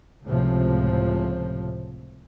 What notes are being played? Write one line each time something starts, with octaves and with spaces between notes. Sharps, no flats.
C#2 A2 C3 F3